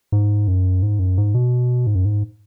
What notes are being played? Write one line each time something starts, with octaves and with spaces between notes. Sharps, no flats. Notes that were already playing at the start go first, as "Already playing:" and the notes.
G#2
F#2
G#2
F#2
G#2
B2
G#2
F#2
G#2